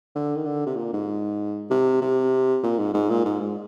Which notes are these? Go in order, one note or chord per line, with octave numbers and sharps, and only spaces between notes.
D3
D#3
D3
C3
A#2
G#2
C3
C3
A#2
G#2
G#2
A#2
G#2
G#2